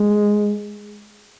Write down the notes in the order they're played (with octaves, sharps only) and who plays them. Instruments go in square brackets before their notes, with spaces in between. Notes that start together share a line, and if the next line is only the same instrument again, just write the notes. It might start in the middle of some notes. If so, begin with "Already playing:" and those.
Already playing: [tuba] G#3